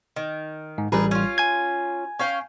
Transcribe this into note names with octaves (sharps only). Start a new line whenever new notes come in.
D#3
G#2
A1 G3 G#4 A#4 B4
C#4 F4
G#5 G#6
C#4 F5 G5